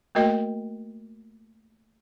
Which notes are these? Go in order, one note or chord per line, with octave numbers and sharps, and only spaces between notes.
A3 A#3 F#4 A#4 D#5 G5